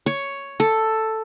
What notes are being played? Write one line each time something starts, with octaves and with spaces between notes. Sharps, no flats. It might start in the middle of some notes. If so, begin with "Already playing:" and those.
C#5
A4